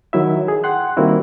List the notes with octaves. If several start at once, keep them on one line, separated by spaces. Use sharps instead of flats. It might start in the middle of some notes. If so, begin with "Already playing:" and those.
D#3 F#3 E4 E5
G#4
F#5 G5 C6 F#6
D#3 G3 A#3 C4 E4 F#4